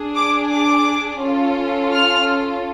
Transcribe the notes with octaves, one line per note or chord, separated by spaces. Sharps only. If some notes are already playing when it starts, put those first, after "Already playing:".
Already playing: D4 G#4
D6
D6
C#4 F4 A4
F6